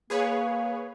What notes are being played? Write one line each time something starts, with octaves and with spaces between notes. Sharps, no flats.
A#3 G#4 B4 C#5